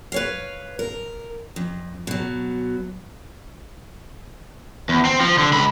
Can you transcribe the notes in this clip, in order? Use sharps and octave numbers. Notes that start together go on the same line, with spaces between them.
B4 C#5 F5
A#4
F2
B2 F#3
E2
C4
F3
D3
C#2 B5